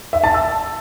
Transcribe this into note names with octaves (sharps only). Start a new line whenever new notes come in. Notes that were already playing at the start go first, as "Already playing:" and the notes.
E5
A5
E6